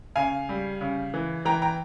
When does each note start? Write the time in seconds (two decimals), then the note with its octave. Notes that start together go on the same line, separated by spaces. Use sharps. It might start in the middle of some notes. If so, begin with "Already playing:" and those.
0.16 C#3 F5 G#5
0.49 G3
0.81 C#3
1.14 E3
1.45 E3 G5 A#5
1.62 G5 A#5